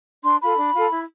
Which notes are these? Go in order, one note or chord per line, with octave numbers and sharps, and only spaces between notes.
D4 C6
F4 A4 B5
D4
F4 A4
E4